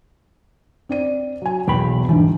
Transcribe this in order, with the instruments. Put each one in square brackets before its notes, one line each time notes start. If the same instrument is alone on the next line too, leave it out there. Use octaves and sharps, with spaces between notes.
[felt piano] C4 D5 D#7
F#3 G#5
[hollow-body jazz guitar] B1 G5 B5 [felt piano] E2
[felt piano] G1 D2 G#2 [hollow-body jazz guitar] E3